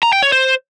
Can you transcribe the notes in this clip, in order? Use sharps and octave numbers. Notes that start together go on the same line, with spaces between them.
A#5
G5
C#5
C5